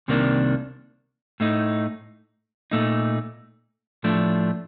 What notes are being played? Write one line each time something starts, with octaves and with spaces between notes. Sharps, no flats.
C2 C3 D#3 A#3 D4
A2 A3 D#4
A#2 A3 D#4
A2 F3 A3 D4